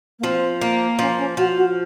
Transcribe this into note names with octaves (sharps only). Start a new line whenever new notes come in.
A#3
F3 C4
A#3
F3 C#4
C#4
F3 F#4
F#4